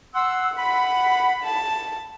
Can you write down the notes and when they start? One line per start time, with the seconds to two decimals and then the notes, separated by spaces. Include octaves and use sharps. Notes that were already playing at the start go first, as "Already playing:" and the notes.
0.15 F#5 C6 E6
0.57 F#5 B5
1.43 A5